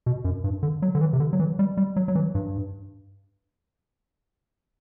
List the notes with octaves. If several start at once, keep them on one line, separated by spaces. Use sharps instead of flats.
B2
F#2
G2
D3
F#3
D3
E3
C3
D3
F#3
E3
G3
G3
F#3
F#3
E3
G2